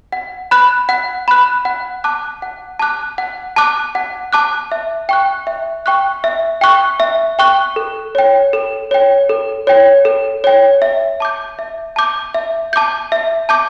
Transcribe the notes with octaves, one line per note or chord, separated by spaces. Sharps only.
F#5
B5 F#6
F#5
B5 F#6
F#5
A5 D6 F#6
F#5
A5 D6 F#6
F#5
A5 D6 F#6
F#5
A5 D6 F#6
E5
G5 C#6 F#6
E5
G5 C#6 F#6
E5
G5 C#6 F#6
E5
G5 C#6 F#6
A4
C#5 G5
A4
C#5 G5
A4
C#5 G5
A4
C#5 G5
E5
A5 D6 G6
E5
A5 D6 G6
E5
A5 D6 G6
E5
A5 D6 G6